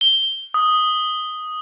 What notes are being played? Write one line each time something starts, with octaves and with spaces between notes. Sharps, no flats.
G7
D#6